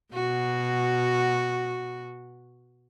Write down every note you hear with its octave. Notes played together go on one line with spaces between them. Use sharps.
B2 F#4